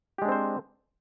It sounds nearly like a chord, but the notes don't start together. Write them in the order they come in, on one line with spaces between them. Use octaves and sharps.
G4 G#3 D4 C4 C5